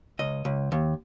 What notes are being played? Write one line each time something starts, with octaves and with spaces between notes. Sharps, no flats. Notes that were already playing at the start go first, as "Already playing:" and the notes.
C#2 D#5
C#2
D#2